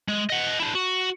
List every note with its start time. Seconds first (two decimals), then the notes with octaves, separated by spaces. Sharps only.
0.08 G#3
0.30 D#5 F#5
0.60 D4 E4
0.75 F#4